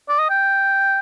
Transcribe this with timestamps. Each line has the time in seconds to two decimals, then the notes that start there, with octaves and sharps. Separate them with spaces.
0.09 D5
0.19 D#5
0.30 G5